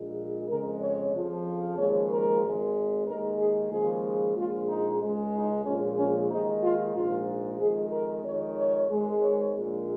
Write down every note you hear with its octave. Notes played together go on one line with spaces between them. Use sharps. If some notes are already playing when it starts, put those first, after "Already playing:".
Already playing: A#1 A#2 G#3
F2 C#3 G#3 A#4
C#5
F2 C#3 F3
D#2 C#3 F3 G#3 C#5
A#4
G#1 G#2 G#3
D#2 D#3 G#3 A#4
G#4
D#2 C#3 F3 G#3 G#4
A#1 A#2 F3 G#3 F4
D#4
C#2 C#3 G#3
D#4
A#1 A#2 F3 G#3 C#4
C#4
D#2 D#3 G#3 D#4
F4
A#1 G#2 F3 G#3 F4
F2 D#3 G#3 G#4
A#4
F2 D#3 G#3 C#5
C#5
G#1 G#2 D#3 G#3
C#5
A#1 A#2 G#3